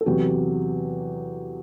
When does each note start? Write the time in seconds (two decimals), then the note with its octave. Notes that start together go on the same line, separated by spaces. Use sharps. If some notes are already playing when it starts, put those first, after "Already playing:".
0.01 A4
0.06 E2 C3 F#3 G4